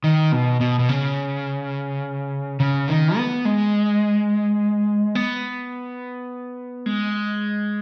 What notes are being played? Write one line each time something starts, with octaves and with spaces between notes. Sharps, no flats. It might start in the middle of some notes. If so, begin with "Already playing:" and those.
D#3
B2
B2
B2
C#3
C#3
D#3
B3
G#3
B3
G#3